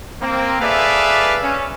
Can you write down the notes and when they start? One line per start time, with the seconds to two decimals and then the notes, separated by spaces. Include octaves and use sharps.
0.21 A#3 C4
0.60 G#4 A4 B4 D5 E5 F5
1.42 C#4